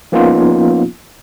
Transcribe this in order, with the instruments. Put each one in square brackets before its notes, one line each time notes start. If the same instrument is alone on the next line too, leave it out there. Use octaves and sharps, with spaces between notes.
[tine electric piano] F3 A#3 B3 C#4 D#4 F4